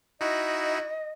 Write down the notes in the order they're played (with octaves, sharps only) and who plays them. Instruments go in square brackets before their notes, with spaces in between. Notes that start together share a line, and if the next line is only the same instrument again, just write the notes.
[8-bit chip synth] D#4 E4 F#4 [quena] D#5